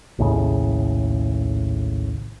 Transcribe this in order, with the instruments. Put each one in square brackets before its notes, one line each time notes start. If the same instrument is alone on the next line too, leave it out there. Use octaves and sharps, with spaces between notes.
[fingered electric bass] A#1 D#2 A2 C#3